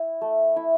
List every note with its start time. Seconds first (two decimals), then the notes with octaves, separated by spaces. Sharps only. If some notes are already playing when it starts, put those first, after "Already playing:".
Already playing: E4
0.21 A3
0.56 E4